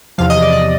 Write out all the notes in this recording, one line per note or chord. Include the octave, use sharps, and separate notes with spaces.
E2 C3 F3 F5
D#5
D5
D5